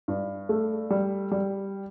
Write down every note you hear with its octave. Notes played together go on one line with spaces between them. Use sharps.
G2
A3
G3
G3